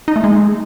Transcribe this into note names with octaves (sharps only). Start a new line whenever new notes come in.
D#4
A3
G#3